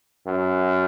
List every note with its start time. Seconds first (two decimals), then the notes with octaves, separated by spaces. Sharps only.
0.27 F#2